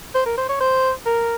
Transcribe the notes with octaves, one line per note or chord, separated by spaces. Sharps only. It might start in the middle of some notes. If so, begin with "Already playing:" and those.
C5
A#4
C5
C#5
C5
A#4